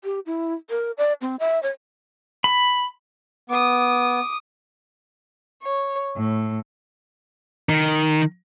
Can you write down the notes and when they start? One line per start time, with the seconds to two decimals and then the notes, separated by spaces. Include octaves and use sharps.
0.04 G4
0.26 E4
0.70 A#4
0.98 D5
1.21 C4
1.40 E5
1.63 C#5
2.44 B5
3.50 B3 D6 D#6
5.62 C#5
6.16 A2
7.69 D#3